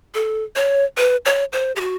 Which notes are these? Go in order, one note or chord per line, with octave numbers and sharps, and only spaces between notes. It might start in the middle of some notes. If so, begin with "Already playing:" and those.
A4
C#5
B4
C#5
C5
G4
F#4